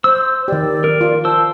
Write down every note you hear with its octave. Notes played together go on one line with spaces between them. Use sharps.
C5 E6
D#3 G4 D5
A#4
F4
C5 A5 E6